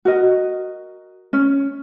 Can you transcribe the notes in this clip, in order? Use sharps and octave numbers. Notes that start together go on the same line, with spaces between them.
F#4 A#4 D#5
C#4